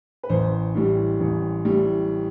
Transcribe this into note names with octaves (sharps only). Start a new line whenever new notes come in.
B4
A1 C5
A2 G3
A1
A2 G3